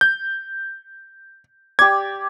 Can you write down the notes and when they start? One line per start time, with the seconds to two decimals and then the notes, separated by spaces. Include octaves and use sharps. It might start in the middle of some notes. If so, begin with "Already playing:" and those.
0.01 G6
1.79 G4 D5 G#6